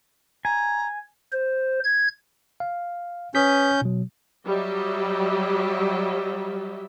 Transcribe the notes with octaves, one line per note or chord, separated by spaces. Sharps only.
G#5 A#5
C5
G#6
F5
C#4 B4 D#6 G6 B6
B2 F#3
F#3 G3 G4 D#5 E5